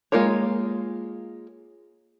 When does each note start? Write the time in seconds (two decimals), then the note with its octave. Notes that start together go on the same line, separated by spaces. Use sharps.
0.12 G#3 A#3 F4 A#4 C#5